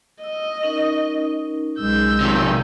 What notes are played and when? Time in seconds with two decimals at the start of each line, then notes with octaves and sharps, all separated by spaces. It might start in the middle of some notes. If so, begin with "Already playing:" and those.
0.24 D#5 E6
0.63 C#4 D#4 A#4
1.80 B1 G#3 E6 G6
2.21 C3 D#3 D5